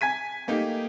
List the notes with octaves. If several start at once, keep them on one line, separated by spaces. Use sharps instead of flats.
G#5 G#6 B6 D#7
A3 A#3 D#4 G4